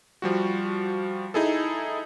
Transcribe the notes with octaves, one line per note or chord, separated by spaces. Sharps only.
F3 G3 F#4
D#4 E4 G#4 A4